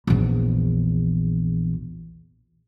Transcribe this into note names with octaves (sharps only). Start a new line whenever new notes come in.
A#1 E2